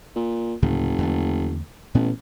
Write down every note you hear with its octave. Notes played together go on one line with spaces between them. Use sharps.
A#2
F#1 D2 A2 C#3
E2 D3 A3
A1 A#2 B3 C#4